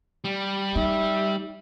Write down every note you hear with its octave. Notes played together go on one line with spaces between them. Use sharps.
G3
D#4 E5